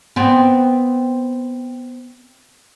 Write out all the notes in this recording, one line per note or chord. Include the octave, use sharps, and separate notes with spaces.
B3 C4